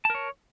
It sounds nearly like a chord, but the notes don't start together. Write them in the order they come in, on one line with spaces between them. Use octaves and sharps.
A5 A#4 C#5